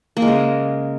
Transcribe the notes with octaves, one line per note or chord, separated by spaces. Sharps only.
A#3
G#3
C#3